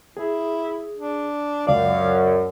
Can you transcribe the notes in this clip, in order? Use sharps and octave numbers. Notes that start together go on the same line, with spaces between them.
E4 G#4
D4
C#2 F#2 D5 F5